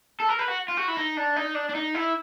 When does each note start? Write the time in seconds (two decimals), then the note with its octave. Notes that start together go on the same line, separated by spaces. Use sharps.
0.20 A4
0.29 A#4
0.39 B4
0.48 F#4
0.68 F4
0.77 F#4
0.88 E4
0.97 D#4
1.17 D4
1.36 D#4
1.55 D4
1.69 D4
1.75 D#4
1.95 E4